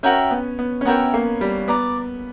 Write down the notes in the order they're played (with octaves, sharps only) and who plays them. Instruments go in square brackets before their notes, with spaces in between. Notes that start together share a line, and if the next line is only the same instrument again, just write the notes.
[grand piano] C#4 [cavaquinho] F#4 A#4 E5 G5
[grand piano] B3
B3
C#4
[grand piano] B3 [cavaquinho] F#4 A#4 E5 G5
[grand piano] A#3
G3
[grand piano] B3 [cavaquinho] D5 A#5 D6